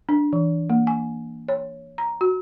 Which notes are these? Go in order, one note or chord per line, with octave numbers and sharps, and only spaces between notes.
D4
E3
A#3
G#5
C#5
A#5
F#4